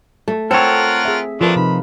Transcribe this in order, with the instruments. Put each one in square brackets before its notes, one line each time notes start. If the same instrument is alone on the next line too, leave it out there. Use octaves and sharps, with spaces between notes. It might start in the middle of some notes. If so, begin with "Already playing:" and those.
[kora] A3
[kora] C4 [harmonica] F4 A#4 F#5 [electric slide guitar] A4 C#5
[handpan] G#4 E5
[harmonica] E3 A3 D4 [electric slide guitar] F3 [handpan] F4 A#4 B4
[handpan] C3 D#4 [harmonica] B5